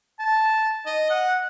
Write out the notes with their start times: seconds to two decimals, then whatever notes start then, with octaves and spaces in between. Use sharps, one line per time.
0.19 A5
0.86 D#5
1.10 F#5